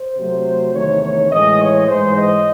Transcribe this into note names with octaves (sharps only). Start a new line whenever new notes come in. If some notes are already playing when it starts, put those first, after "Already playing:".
Already playing: C5
C3 F#3 A3
E2 C3 D#3 A3 C#5
C#5
A2 E3 G#3 D#5
C#5
G#2 E3 G#3 C5
D#5